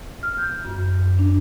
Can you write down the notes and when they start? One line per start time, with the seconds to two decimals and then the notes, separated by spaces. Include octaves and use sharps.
0.23 F6
0.38 G6
0.65 F#2
1.19 D4